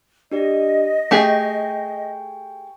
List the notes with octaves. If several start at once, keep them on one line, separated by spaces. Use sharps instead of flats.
D4 G4 D5 D#5
A3 G4 G#4 G5 G#5 C#6